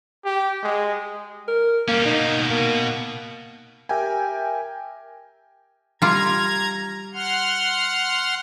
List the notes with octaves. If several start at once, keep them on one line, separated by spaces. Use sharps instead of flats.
G4
G#3
A#4
G3 A#3 C#4
B2 A#3 D#4
B2 A#3
G4 A#4 E5 G5 G#5
G3 F4 A#5 G#6
F#5 C6 F6